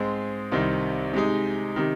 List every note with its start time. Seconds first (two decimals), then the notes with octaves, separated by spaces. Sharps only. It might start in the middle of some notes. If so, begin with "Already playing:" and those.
Already playing: G#2 G#3 C4
0.52 C2 C3 D#3 C4
1.14 C3 G#3 D#4
1.76 C3 D#3